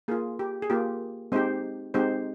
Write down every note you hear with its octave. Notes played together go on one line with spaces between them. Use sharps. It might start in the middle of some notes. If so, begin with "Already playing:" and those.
A#3 F4 G#4
G4
G#4
A#3 F4 G4
G#3 C4 D#4 G4 C5
G#3 C4 D#4 G4 C5